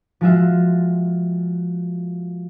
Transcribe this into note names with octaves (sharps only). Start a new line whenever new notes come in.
F3 G#3 F4 F#4 E5